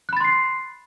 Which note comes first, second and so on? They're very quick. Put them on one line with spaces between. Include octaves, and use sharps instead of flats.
F#6 B5 A6 C6 C7